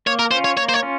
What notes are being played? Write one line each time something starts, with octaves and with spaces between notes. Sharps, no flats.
A#3 C#5
A#4
C#4 F4 C5
C#5
A#3 C#5
C5
C#5
C#4 F4